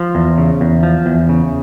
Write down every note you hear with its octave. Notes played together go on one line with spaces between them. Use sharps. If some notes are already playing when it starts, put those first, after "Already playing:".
Already playing: F3
E2
C#3
E2
F3
E2
C#3